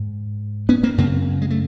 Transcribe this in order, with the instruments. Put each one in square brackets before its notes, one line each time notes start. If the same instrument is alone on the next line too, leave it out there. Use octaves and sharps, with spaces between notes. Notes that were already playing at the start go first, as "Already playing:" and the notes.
Already playing: [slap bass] G#2
B3 C#4
A#3 C4
F#2 C#3 A#3 C4
G#3
A3